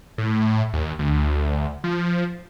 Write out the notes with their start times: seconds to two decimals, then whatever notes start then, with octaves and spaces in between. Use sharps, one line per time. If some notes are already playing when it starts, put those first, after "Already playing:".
0.18 A2
0.73 D#2
0.99 D2
1.84 F3